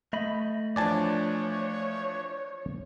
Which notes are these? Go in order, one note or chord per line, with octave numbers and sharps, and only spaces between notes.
A3 D#5 B5
E3 F3 D4 C#5 D5 G#5 A5